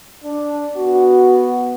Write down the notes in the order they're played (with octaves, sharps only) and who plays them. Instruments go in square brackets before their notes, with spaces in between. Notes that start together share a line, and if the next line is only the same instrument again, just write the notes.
[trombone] D4
[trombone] B3 [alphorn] F#4